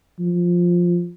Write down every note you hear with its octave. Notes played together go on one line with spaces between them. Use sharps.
F3